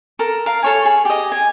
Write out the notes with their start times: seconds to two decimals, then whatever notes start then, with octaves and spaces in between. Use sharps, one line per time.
0.19 A4 A#4
0.46 A#4 F5
0.62 A4 C#5 G#5
0.85 G#4
1.05 G4 D#5
1.32 G#5